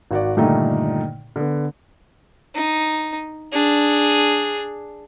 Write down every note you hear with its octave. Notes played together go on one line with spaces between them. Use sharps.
G#1 F#4 D5
G2 A#2 D3 D#3 A3 D#4
D3 B3
D#4
D4 G#4